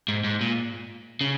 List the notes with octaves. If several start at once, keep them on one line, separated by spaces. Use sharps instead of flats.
G#2
G#2
A#2
C#3